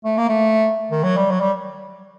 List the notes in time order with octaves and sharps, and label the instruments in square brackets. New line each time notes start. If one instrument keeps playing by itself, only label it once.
[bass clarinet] A3
A#3
A3
D#3
F#3
G3
F#3
G3